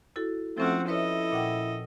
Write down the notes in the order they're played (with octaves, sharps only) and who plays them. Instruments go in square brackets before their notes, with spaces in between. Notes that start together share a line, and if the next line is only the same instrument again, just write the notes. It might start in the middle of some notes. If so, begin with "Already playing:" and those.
[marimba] E4 F#4 A4
[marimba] F3 C#4 F4 [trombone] A3 [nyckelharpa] C4 F#5
[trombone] E4 [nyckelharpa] A4 D#5 [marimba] B4 C#5 E5
[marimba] A#2 F#5 G5